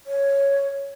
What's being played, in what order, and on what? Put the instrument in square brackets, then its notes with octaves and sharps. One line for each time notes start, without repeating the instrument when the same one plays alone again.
[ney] C#5